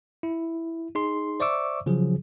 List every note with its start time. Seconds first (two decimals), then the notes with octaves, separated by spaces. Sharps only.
0.23 E4
0.95 D#4 G#4 C6
1.40 C5 D5 E5 C#6 D6 E6
1.86 C#3 F3 F#3 G#4